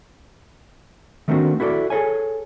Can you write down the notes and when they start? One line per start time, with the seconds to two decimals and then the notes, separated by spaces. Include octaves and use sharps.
1.28 D#3 A3 A#3 C4 D4 F#4
1.60 E4 F#4 A4 C5 D5
1.90 G#4 A4 B4 C#5 G#5